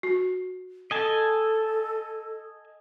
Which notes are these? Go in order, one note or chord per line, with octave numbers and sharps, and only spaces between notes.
F#4
A4 D#5 G#5 A5